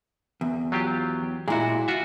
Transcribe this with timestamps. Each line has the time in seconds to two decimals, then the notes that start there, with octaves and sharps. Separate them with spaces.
0.41 E2
0.72 F#3 F4 G4
1.48 A#2 G#3 E4 F#4
1.88 F4 F#4 E5